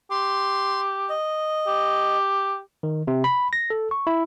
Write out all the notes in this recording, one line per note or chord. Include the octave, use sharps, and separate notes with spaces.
G4 C6
D#5
G4
D#3
C3
B5
A#6
A4
C#6
E4